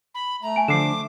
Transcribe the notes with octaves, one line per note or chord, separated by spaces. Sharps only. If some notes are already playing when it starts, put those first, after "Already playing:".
B5
A3 A#5
G#5 D7
D3 F3 D6 C7 D7 E7